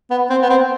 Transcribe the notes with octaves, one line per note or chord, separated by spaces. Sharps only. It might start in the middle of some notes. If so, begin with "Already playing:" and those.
B3
C4
B3
C4